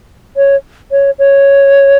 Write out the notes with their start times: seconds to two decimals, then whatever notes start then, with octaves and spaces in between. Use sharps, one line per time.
0.37 C#5
0.91 C#5
1.19 C#5